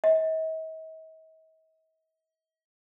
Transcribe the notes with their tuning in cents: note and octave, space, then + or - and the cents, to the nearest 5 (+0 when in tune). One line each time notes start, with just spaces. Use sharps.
D#5 +45